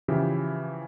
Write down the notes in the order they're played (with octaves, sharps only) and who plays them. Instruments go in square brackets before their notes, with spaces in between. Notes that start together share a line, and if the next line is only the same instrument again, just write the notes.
[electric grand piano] C#3 E3 F3 E4 G4